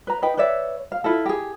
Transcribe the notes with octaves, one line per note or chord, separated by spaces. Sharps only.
B4 A#5
D#4 B4 G5
B4 C#5 D5 E5
F5
E4 F4 A4
G4 G#4